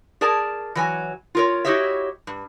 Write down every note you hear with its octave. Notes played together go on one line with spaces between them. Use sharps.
G#4 A#4 D5 A5
E3 F#3 G#5
F4 A#4 C#5
E4 F#4 G4 C#5 D#5 E5
G2